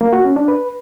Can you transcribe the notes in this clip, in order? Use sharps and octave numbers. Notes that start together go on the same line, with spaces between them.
A#3
F#4
C#4
D4
B4